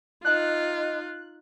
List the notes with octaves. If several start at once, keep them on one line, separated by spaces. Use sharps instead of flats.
D#4 F4 F#6